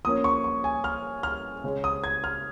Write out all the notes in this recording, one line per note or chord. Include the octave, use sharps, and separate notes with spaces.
F3 A#3 C#4 D#6
C#6
C#6
G#5
F6
F6
C#3 G#3 C#4
D#6
G#6
F6